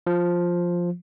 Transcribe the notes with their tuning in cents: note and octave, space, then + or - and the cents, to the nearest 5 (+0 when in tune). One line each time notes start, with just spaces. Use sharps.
F3 +5